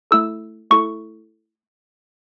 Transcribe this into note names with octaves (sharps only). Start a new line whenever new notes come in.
A3 E4 A4 E6
A3 E4 A4 C#6